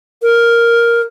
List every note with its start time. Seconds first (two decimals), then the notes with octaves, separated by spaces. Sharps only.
0.22 A#4